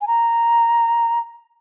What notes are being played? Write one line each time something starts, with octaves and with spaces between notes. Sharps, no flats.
G#5
A#5